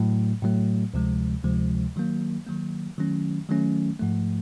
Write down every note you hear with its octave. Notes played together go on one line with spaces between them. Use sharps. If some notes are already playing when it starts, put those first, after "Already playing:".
Already playing: A2 F#3 A3
A2 F#3 A3
D2 C3 F3 G#3
D2 C3 F3 G#3
D#3 F#3 A#3
D#3 F#3 A#3
D#3 F#3 A3 C#4
D#3 F#3 A3 C#4
G#2 F3 A3